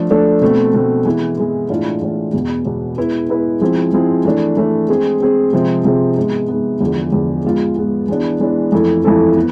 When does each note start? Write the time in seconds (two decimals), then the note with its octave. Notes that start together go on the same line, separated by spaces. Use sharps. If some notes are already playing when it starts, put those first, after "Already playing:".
Already playing: F3 A3 D4 A4
0.10 F3 A3 D4 A4
0.41 B2 A3 C4
0.74 B2 A3 C4
1.06 E3 G#3 B3 E4
1.37 E3 G#3 B3 E4
1.69 A2 E3 G#3 D4 F4
2.01 A2 E3 G#3 D4 F4
2.33 E2 B2 B3
2.65 E2 B2 B3
2.97 G#3 B3 E4 B4
3.29 G#3 B3 E4 B4
3.61 F3 G#3 C4 E4 G#4
3.93 F3 G#3 C4 E4 G#4
4.25 E3 A3 D4
4.57 E3 A3 D4
4.89 G#3 C4 G#4
5.21 G#3 C4 G#4
5.53 C3 F3 G#3 C4 G#4
5.84 C3 F3 G#3 C4 G#4
6.17 G#2 G#3 B3
6.48 G#2 G#3 B3
6.81 E2 D3 F3 G#3
7.13 E2 D3 F3 G#3
7.44 G#2 G#3 B3 F4
7.76 G#2 G#3 B3 F4
8.08 E3 G#3 B3 D4
8.40 E3 G#3 B3 D4
8.72 F2 E3 A3 E4 A4
9.04 F2 E3 A3 E4 A4
9.36 B3